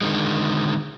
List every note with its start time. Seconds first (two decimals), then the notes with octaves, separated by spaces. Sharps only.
0.01 D3 D#3 G#3